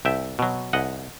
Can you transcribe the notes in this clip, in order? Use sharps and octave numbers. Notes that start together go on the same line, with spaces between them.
C2 E5 G5
B2 F#3
C2 D#5 F#5